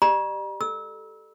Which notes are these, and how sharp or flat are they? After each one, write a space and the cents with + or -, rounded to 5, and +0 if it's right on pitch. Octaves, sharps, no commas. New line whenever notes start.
G4 +0 D5 +40 A#5 +40
A4 +0 E6 -25